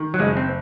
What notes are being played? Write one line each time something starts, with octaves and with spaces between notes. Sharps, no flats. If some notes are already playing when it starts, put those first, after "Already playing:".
Already playing: D#3
F#3
F#1 G#3
C4